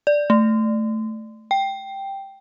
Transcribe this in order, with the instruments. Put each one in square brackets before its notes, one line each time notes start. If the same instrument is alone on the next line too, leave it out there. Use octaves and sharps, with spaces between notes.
[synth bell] D5
A3
G5